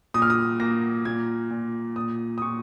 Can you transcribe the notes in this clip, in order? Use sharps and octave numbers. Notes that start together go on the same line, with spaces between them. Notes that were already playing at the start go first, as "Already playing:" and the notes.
A#2 D#6
F6
D#6
A#3 A#6
A#2 G#6
A#2
A#2 D#6
D#6
A#2 C#6